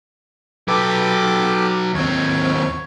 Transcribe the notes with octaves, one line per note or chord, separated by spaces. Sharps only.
F#3 G4 A4 B4 D6
D#2 C4 C#5